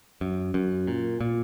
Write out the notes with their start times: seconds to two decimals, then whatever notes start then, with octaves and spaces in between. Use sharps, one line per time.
0.21 F#2
0.54 F#2
0.87 A#2
1.21 A#2